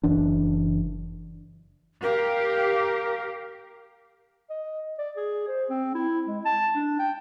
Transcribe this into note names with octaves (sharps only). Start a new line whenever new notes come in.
F#1 E3 D4
G4 A#4 F5
D#5
D5
G#4
C5
C4
E4
G#3
A5
D4
G5